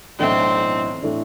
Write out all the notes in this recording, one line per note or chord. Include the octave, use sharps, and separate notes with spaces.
B1 A2 E3 A3 C4 D4
A2 E3 A3 D4